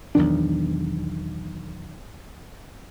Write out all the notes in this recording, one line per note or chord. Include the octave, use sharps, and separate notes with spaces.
B1 E2 D#3 D4